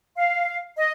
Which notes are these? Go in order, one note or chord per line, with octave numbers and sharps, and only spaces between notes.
F5
D#5